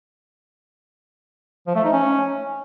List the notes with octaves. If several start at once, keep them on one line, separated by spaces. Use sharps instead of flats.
F3
A3
D#4
C#4